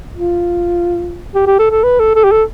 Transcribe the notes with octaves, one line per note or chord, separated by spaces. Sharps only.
F4
G4
G4
A4
A4
B4
A4
A4
G4
A4